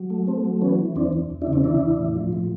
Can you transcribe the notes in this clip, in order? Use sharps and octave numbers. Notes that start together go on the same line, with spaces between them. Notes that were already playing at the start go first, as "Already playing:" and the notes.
Already playing: F#3
A3
A3 C4
F#3
E3 B3 C#4
E3
E2 C4 D4
E2
E2
D4 E4
C#3
C4 D4
E3 D4 E4
E2
A2
F3
A2